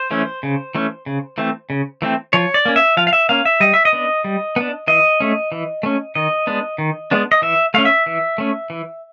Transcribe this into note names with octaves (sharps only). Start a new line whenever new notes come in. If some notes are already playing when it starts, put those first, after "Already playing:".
Already playing: C5
E3 A3 C#4
C#3
E3 A3 C#4
C#3
E3 A3 C4
C#3
E3 A3 C4
F3 C#5
D5
A#3 C#4
E5
F3 F5
F5
E5
A#3 C#4 F5
E5
G3 D#5
E5
D#5
B3 D4
G3
B3 D4
E3 D#5
A3 C#4
E3
A3 C#4
D#3 D#5
G#3 B3 D4
D#3
G#3 B3 D4
D#5
E3 E5
A3 C#4 F5
E5
E3
A3 C#4
E3